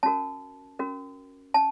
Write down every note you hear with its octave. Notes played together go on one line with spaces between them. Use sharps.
C#4 F#4 A#4 A5
C#4 F#4 A#4
C#4 A5